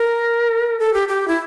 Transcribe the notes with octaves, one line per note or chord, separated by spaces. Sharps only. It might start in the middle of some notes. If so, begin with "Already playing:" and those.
Already playing: A#4
A4
G4
G4
E4